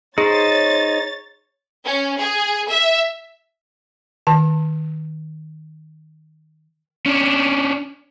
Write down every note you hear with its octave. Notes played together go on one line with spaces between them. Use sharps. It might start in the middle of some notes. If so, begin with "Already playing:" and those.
D#4 G#4 C5 C#5 A6
C#4
G#4
E5
D#3 A5
C#4 D4